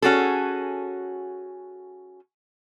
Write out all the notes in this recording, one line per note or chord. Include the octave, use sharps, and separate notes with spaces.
C#4 F#4 G#4 A4